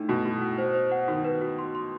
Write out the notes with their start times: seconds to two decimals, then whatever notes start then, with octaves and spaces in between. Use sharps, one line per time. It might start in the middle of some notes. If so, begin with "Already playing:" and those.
Already playing: A2 D#4
0.09 B2 F#4
0.25 F#4
0.42 F#4
0.58 C5
0.75 C5
0.92 F#5
1.08 D#3 F#4
1.25 B4
1.41 F#4
1.59 C6
1.75 C6